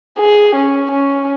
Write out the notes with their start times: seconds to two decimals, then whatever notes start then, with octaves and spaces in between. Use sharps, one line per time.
0.19 G#4
0.55 C#4
0.91 C#4